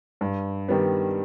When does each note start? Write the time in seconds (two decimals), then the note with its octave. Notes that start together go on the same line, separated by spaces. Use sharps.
0.21 G2
0.68 D#3 G3 B3